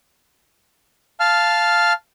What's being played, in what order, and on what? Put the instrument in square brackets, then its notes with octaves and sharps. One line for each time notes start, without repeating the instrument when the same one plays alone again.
[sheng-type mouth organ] F5 A5 F6